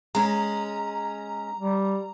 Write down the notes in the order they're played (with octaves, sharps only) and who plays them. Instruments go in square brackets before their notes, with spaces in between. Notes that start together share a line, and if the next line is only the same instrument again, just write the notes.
[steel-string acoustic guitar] G#3 C#4 [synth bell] A#5
[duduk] G3